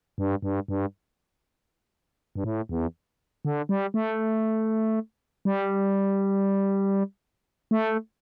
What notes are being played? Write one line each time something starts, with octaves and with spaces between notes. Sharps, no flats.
G2
G2
G2
G2
A2
E2
D3
G3
A3
G3
A3